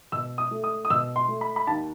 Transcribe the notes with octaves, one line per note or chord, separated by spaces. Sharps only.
B2 E6
D#6
A3
D#6
D#6
B2 E6
C6
A3
B5
B5
D#2 A5